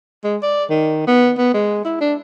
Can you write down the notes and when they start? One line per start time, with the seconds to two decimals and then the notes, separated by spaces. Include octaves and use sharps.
0.24 G#3
0.42 D5
0.70 D#3
1.07 B3
1.38 B3
1.54 G#3
1.85 E4
2.01 D4